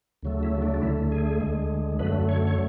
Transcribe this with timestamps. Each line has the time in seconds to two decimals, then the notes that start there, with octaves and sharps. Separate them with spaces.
0.23 D2 C#3 F#3 A3
0.43 E4
0.62 D4
0.74 D4
0.81 D2 D3 A3 E4
1.12 G#4
1.41 D2 D3 G#3
1.99 F#2 D3 F#3 A3 B4
2.29 C#5
2.47 C#5